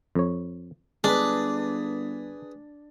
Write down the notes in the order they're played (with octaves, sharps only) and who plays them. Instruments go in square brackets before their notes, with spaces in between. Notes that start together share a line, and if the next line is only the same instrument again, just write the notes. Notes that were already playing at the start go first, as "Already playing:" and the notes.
[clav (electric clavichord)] F2 C#5
[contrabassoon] G1 [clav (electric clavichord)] G#3 [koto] D4 [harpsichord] G#4 B4